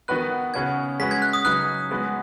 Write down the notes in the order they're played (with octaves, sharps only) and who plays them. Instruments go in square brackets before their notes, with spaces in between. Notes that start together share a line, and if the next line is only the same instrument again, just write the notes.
[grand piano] D#3 B3 F#4 B4 [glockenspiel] F#6
[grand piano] C#3 B3 F#4 [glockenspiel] G#6
[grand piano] G#3 C#4 F#4 B4 [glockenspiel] B6
[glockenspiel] G#6
F#6
D#6
[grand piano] C#3 F#3 D#4 B4 [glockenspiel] F#6
[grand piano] G#3 B3 F#4 B4